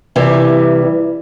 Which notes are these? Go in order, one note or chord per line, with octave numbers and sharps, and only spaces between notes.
C3 E3 G3